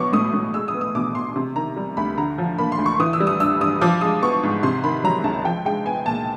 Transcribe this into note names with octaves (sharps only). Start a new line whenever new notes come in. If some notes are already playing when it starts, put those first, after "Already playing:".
Already playing: B2 F#3 B3 C#6 D6
A2 D#6
A2
G#3 E6
D#6
B3
D#6
B2 D6
B2 C6
C3
D#3 A#5
G3
D2 B5
D3 A#5
F3
A#3 B5
C6
D2
C#6
E3 D#6
E6
G3
D#6
G2 E6
G2 D#6
F3 D6
G#3 D#6
B3 C#6
G#2
C3 C6
D#3 B5
F#3 A#5
C#2 A5
F3 G5
G#3 G5
B3 G#5
A#2 A5